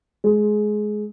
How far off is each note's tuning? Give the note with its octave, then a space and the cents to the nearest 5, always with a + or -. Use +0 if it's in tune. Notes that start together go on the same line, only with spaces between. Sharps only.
G#3 +20